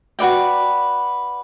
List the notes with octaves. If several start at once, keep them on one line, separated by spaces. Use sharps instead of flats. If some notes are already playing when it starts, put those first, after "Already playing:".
F#4 B4 D5 G5